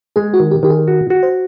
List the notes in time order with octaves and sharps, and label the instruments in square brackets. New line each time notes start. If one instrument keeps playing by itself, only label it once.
[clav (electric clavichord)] G#3 [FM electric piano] G#4
[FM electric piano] F#4
[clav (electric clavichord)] D#3
[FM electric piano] G4
[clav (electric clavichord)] D#3 [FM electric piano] G4
[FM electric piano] G#4
[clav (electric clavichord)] F#4
F#4
[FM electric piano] C5